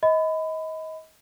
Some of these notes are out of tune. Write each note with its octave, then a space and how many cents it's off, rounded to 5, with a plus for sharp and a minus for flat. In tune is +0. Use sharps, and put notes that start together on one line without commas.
D#5 +30 B5 +25